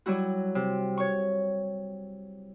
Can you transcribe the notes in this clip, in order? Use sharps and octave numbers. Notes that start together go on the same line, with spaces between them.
F#3 G3 E4 F#4
C3
C#5 C#6